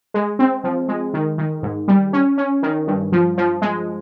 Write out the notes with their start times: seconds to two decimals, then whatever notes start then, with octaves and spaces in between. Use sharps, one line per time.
0.14 G#3
0.39 C4
0.64 F3
0.88 G#3
1.14 D#3
1.38 D#3
1.63 G#2
1.88 G3
2.13 C#4
2.38 C#4
2.63 D#3
2.87 G2
3.12 F3
3.38 F3
3.62 G#3